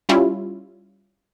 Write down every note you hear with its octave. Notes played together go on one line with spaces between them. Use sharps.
G3 C#4 E4 F4